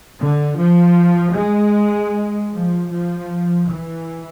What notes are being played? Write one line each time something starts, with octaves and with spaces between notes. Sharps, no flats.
D3
F3
G#3
F3
F3
E3